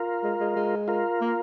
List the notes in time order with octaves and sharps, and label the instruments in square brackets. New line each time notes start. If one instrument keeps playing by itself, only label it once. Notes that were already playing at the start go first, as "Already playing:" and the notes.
Already playing: [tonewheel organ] F4 A#4
[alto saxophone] G#3
G#3
G#3
[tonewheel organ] F4 A#4
[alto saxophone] A#3